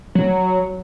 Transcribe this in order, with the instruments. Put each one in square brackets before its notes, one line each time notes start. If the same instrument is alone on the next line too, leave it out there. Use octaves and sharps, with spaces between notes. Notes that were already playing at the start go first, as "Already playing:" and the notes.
[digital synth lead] F#3